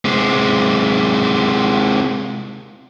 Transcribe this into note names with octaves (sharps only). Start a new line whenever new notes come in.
C3 G#3